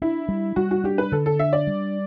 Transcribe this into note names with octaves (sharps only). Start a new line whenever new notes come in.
D4 E4
G3
G3 F#4
F#4
D4 G4
B4
D3 A4
A4
D4 E5
D5
G3